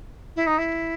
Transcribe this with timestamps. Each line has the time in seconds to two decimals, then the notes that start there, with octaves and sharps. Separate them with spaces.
0.36 E4
0.46 D#4
0.58 E4